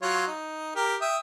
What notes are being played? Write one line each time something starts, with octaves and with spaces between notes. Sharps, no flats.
F#3 F4 C#5
D#4
G4 A#4
E5 G5 D#6